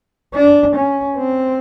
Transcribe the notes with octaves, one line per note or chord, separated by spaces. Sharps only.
D4
C#4
C4